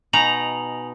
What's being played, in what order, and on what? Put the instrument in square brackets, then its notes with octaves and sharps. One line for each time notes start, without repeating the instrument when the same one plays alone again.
[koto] B2 D#4 A#5 [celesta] G#5 F7 F#7